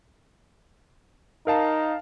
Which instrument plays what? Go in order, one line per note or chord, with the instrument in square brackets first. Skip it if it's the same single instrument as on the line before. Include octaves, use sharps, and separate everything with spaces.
[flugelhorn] D#4 [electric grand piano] A#4 F5 A5